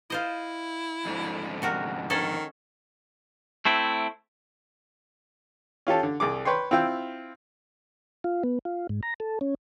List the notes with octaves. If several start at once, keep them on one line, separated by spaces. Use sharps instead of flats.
E4 F4 C5 D#5
F2 G#2 D3
C3 F#4 A#4
D#3 G#3 C#4 A4
A3 C4 E4
C#4 F4 G4 A4
D3
C2 G#4 D6
B4 C#5 G5 C6
C4 E4 F4 G5
F4
B3
F4
G#2
A#5
A4
C#4